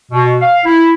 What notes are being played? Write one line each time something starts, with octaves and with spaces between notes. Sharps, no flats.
B2
F5
E4